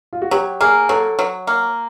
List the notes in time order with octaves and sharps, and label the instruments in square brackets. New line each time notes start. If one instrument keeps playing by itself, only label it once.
[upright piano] F4
F#4
[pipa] F#3 [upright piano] G4
[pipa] A#3 [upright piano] G#4
[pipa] F#3 [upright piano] A4
[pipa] F#3
A#3